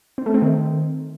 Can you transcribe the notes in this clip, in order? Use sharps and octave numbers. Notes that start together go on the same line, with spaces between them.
C4
A3
C4
D#3